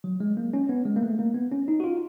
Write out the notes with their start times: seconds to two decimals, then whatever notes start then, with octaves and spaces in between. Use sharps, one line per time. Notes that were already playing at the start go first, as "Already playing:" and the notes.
0.04 F#3
0.20 G#3
0.37 A#3
0.53 C#4
0.69 B3
0.85 G#3
0.96 A#3
1.02 A3
1.19 A#3
1.35 B3
1.51 C#4
1.68 D#4
1.80 F#4
1.84 F4